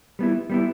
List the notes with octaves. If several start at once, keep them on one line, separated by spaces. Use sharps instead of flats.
G3 B3 E4
G3 B3 E4